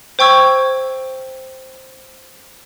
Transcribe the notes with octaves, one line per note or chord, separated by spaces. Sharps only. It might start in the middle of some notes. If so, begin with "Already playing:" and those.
C5 G5 C#6 E6 G#6